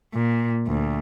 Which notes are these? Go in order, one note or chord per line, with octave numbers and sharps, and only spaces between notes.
A#2
D2